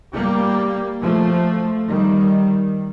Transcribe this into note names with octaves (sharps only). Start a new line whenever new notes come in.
G3 A#3
F3 A3
D#3 G3